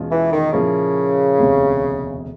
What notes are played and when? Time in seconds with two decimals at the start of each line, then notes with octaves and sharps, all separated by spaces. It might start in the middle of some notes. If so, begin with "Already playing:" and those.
Already playing: E2 B2 G#3 C#4 F4
0.11 E3
0.32 D#3
0.53 A#2 C#3 F3 A#3 C#4 E4
1.38 E1 D2 C3